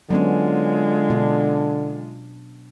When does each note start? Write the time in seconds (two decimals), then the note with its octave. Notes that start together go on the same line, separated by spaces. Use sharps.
0.10 D3 F#3 G#3 B3 C#4 F4
1.10 B2 D4